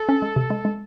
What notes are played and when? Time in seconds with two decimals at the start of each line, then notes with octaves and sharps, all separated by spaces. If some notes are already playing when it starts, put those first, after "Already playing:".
Already playing: A4
0.09 C#4
0.22 G#3
0.36 C3
0.50 G#3
0.65 G#3